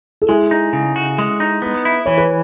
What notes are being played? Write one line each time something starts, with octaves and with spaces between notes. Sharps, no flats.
A4
G#3 E4 G#4
D#4
C#3
F#4
G#3
D#4
B3
E4
E3 C#5
B4